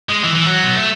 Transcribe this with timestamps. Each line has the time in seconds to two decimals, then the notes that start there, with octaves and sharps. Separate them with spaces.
0.09 G#3
0.24 E3
0.35 E3
0.46 F#3
0.64 B3
0.76 A3